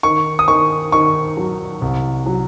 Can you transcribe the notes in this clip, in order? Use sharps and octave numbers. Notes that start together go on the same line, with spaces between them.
D#3 C#6
D#6
D#3 C#6
D#3 C#6
F#3
C2
F#3